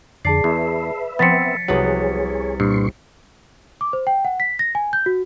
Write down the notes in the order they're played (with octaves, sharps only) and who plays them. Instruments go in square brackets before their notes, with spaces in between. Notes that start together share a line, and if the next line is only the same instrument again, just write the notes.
[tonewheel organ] F2 D3 [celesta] G#4 A5 C7 [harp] D5
[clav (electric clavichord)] E2 [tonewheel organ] B4 E5
[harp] F3 [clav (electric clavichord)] B3 C4 [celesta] A6 B6 C#7
[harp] C2 B3 B4 [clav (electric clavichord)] F#3 [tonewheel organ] G#4 C#5
[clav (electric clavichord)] G2 [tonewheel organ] A#2 C6 C#6
[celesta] D6
C5
G5
F#5
B6
A#6
G#5
G6
F#4